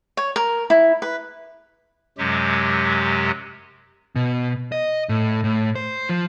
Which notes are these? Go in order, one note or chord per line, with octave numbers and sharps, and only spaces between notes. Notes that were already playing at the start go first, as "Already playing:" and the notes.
C#5
A#4
E4
B4
F#2 C3 F#3 G#3 G4
B2
D#5
A2
A2
C5
F3